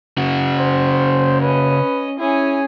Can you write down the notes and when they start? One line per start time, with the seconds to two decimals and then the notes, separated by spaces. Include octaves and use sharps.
0.18 C#3 F#4
0.58 C5
1.41 C#4 B4 D#5
2.19 C#4 E4 G#4